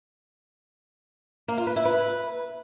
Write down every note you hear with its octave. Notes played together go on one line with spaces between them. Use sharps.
A#3
F4
B4
E4
B4